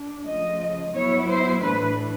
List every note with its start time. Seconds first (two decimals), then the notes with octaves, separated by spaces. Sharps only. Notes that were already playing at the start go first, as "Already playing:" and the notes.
Already playing: D4
0.25 C#3 F3 A3 D#5
0.94 F#3 B3 E4 C#5
1.28 C5
1.62 A2 E3 A3 D4 B4